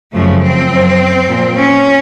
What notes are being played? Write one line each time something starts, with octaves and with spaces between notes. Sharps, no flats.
F#2 C#3 F3 A3
C4
F#2 F3
A#2 F3
C#4